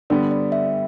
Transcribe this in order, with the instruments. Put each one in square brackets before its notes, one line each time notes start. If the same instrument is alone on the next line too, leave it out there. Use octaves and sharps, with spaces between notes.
[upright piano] D3 G3 B3 [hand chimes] D5
[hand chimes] D5
E5